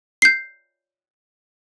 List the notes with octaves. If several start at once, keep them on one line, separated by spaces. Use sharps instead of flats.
G6 C7